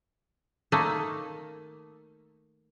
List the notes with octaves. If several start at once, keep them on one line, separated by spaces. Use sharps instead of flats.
D#3 A3 A#3